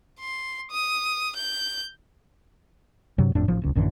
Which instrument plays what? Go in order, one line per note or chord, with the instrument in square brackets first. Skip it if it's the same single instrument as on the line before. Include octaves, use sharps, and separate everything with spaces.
[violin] C6
D#6
G6
[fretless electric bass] G2 C3 F#3
G1 F2 A2 D4
A1 F3
D#1 C#2
A1 F#2 D3 E3